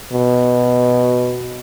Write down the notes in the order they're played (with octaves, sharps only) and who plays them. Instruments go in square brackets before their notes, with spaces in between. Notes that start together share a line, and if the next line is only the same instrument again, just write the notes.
[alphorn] B2